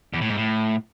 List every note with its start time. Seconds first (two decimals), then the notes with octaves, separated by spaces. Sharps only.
0.13 E2
0.21 A2
0.29 G#2
0.37 A2